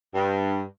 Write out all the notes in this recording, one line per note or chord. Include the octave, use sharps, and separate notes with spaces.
G2